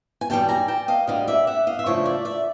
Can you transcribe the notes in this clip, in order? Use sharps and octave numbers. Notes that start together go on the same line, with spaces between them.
G#5
F#2 D#3 G3 G5 A5
G#5 A#5
G5 A5
D#5 F5
D2 D3 G3 D#5 F5
D5 E5
E5 F#5
D#5 F5
E5
C#3 F3 A3 D4 C#5 D#5
D5 E5
D5 E5